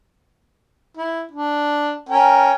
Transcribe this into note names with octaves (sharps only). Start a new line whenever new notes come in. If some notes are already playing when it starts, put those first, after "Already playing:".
E4
D4
C#4 A#4 G5